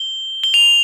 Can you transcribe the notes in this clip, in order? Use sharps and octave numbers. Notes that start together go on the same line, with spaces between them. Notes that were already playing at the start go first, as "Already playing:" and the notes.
Already playing: G7
G7
F7